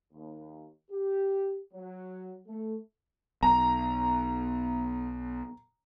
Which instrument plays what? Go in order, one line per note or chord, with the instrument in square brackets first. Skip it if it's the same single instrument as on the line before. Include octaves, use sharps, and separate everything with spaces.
[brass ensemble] D#2
G4
F#3
A3
[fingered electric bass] B1 [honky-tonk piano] A#5